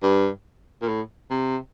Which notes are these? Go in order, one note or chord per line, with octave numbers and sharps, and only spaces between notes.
G2
A#2
A2
C3